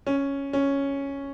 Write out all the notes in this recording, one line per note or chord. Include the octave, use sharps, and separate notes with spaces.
C#4
C#4